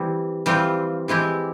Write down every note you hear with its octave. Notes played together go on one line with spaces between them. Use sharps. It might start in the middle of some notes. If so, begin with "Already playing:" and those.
Already playing: E3 G3 C4
E3 G3 C4 F4
E3 G#3 C4 E4 G4